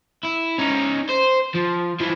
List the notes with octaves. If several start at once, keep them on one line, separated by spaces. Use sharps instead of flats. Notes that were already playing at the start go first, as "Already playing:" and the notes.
E4
C#4 D#4
C5
F3
E3 F3